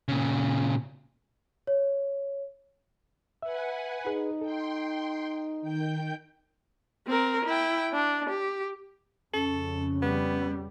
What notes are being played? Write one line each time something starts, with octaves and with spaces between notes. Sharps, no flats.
A#2 C#3
C#5
B4 E5 F#5 G#5
D#4 G#4 B4
A4 G5 C6
D#3 G5 G6
C4 A#4
E4 G5
D4
G4
F2 C#3 C#4 A4
G3 B3